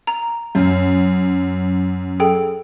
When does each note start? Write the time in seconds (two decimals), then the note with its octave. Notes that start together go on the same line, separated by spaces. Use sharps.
0.07 A#5
0.55 F#2
2.20 G#4 A4 G5